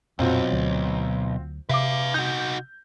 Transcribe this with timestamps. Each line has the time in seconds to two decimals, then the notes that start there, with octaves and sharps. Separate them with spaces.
0.19 B1 F2 A#2 C4 F4 F#4
0.52 D2 F#3
1.69 C3 B4 E5 F5 D6
2.14 D#4 F#4 G6